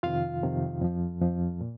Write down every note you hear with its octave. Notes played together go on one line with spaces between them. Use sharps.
F2 C3 D#3 F4 F5
F2 C3 D#3
F2 F3
F2 F3
A#2